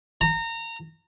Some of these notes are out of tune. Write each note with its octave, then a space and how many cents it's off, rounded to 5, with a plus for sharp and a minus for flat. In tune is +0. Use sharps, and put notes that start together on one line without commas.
A#5 -25